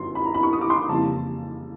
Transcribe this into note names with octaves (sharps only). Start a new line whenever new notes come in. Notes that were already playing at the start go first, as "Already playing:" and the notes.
Already playing: G1 F#2 C6
B5
A#5
B5
C#6
D#6
D6
C6
F2 C#3 E3 G3 A#3 A5